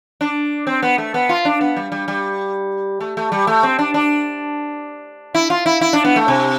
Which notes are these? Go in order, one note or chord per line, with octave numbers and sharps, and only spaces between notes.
D4
C4
B3
A3
B3
F4
D4
B3
G3
G3
G3
A3
A3
G3
A3
C4
D4
D4
E4
F4
E4
E4
D4
B3
A3
C3